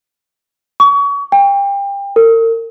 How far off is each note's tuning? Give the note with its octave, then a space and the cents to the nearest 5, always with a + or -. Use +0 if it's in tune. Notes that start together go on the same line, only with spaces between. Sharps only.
C#6 +30
G5 +30
A#4 -40